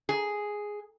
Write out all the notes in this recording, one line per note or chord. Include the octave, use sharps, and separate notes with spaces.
G#4